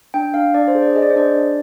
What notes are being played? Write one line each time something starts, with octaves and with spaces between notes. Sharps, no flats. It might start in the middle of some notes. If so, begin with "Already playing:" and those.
D4 G5
D4 F5
D4 D5
C5
G#4
D5
G#4 D#5
D5
C5
D4 D5
D4